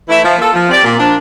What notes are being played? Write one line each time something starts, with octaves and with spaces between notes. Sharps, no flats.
E3 A3 E4
F3
A#3 F4 A4
F3
C4 G4 D5
A#2
F3 A#3 D4